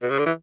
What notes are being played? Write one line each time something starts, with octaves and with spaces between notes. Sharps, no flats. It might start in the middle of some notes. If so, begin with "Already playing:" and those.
B2
C#3
D3
E3